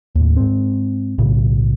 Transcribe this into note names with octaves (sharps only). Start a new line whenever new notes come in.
D#2 A2
G#2 C4
B1 A2 C#3